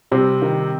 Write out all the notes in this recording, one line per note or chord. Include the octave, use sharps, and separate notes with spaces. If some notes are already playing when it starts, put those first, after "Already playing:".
C3 G3 C4
D#3